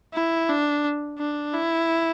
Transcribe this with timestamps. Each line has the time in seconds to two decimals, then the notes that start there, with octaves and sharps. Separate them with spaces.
0.14 E4
0.49 D4
1.18 D4
1.54 E4